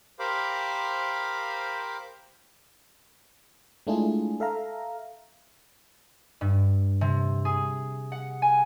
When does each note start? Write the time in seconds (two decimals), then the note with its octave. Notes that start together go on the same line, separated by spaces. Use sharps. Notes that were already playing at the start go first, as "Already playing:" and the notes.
0.19 G4 A#4 C5 F5 B5 D6
3.87 G#3 A3 D4 E4 F4 G#4
4.40 A4 E5 F5 A#5
6.41 G2
7.01 C3
7.45 G#4
8.12 F#5
8.42 G#5